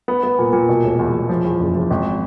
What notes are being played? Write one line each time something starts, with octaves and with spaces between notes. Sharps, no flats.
B3
B3
A#2
A#2
B2
E1
E2
E2
F3
E2
F#1
F3
G#1